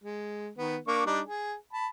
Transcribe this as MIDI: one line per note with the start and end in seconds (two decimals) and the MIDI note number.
0.04 0.48 56
0.58 0.77 51
0.58 0.77 59
0.87 1.05 58
0.87 1.05 62
0.87 1.05 85
1.06 1.20 55
1.06 1.20 62
1.06 1.20 63
1.26 1.54 68
1.73 1.87 81
1.73 1.87 83